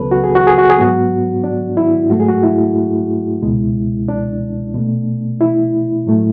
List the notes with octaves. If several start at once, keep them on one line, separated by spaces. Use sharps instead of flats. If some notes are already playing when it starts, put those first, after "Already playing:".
Already playing: C#2 C#3 F#3 B3 A4 B4
F#4
G#4
F#4
G#4
F#4
G#4
G#2 F#3 B3 F#4
D4
E4
G#2 F#3 A3 F#4
G#4
F#4
E4
C#2 B2 G#3
D4
B2 A3
E4
A2 F#3 A3